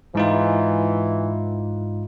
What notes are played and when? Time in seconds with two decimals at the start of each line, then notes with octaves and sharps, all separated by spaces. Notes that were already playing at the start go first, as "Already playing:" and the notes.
0.15 G#2 E3 D#4 F4